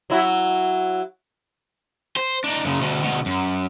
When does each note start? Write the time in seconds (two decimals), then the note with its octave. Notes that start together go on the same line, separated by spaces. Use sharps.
0.10 F#3 E4 F#4
2.17 C5
2.44 D4 D#4
2.65 F#2 C#3
2.81 D2 B2
3.03 D2 B2
3.26 F#2